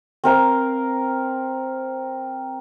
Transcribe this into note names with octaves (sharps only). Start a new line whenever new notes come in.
C4 A#4 F5